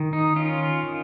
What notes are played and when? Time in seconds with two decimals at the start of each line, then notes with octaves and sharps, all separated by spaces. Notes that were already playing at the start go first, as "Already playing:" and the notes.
Already playing: D#3
0.13 D#4
0.36 C#4 F4
0.83 D#3